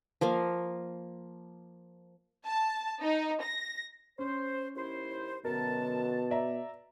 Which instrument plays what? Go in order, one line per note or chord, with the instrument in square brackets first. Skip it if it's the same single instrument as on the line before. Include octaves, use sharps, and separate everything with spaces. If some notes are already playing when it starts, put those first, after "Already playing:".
[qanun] F3 A#3 F5
[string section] A5
D#4
A#6
[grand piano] C#4 [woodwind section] C5
[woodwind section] D#2 E4 C5
[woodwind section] F#2 D3 A5 [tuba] B2 [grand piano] A#4
[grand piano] D5 E5 A#5